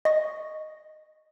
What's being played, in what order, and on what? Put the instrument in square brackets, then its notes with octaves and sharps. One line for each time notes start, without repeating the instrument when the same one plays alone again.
[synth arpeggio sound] D#5 C#6 A#6